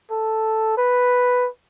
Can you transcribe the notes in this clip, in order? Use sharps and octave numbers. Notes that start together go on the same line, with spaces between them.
A4
B4